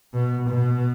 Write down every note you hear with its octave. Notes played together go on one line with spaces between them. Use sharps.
B2
B2